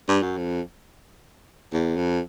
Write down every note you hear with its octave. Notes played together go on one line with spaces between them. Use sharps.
G2
F#2
F2
E2
F2